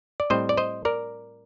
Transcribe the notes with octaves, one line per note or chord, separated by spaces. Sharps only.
D5
A2 G3 C4 C5 D#5
D5
C5 D#5
A#4 D5